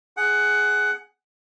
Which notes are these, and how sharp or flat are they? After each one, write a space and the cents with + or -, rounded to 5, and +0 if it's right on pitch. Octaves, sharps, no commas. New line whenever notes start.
G#4 +5 F#5 +15